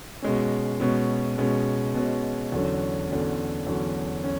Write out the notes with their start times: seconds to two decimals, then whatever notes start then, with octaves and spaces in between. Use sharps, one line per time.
0.22 B2 G#3 C#4
0.80 B2 G#3 C#4
1.38 B2 G#3 C#4
1.94 B2 G#3 C#4
2.52 E2 D3 F#3 C#4
3.09 E2 D3 F#3 C#4
3.67 E2 D3 F#3 C#4
4.24 C#4